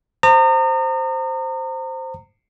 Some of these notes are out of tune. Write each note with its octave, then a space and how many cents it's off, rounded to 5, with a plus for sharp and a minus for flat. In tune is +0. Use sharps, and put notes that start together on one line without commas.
C5 +0 A#5 -35 D#6 -40